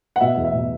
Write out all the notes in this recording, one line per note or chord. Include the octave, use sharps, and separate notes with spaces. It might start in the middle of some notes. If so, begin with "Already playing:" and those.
F#5
B2 E5
E2
E5
B2